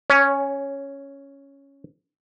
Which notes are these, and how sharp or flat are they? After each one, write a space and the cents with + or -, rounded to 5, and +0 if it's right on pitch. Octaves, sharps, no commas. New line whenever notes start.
C#4 +0 C#5 +30